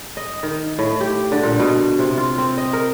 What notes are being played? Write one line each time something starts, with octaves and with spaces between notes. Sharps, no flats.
D#5
D#3
A2
G4
D3
A#2
B2
C3
F4
C4
D#5
A#4